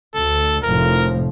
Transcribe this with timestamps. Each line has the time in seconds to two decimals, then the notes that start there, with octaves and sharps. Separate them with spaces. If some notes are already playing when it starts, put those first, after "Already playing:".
0.15 D2 A4
0.64 F1 A2 F3 A#4